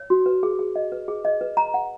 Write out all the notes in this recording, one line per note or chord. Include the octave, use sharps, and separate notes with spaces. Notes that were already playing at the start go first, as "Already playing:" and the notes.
Already playing: C#5
F#4
B4
G#4
G#4
D#5
B4
G#4
D#5
B4
A#5
F#5